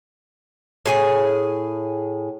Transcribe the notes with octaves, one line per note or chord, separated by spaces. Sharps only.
A2 G#4 G#5